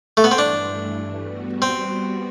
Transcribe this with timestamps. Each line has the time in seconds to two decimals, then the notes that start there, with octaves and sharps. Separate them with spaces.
0.17 A3
0.24 B3
0.31 C4
0.38 G2 E3 A3 D4
1.21 G3 B3 F#4
1.62 C4